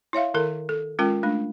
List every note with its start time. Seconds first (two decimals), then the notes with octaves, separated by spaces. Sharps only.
0.13 E4 C#5 E5 F5
0.34 D#3 E4 A4 A#4
0.69 A4
0.99 G#3 C#4 F4 A#4 G5
1.23 A3 D4